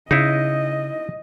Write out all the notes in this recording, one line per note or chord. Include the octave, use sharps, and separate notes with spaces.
C#3 D#4 E4 D#5